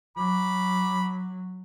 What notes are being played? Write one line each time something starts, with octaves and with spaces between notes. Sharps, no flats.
F#3 B5 D6